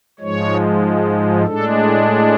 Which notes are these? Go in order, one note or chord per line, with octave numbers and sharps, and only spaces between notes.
G#2 F3 G#3 C#5
A2 G#3 D4 A4